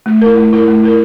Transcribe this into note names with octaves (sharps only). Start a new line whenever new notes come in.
A3
E4 A#4
A3
E4 A#4
A3
E4 A#4